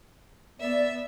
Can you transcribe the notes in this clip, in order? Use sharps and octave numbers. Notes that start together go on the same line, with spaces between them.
B3 D5 E5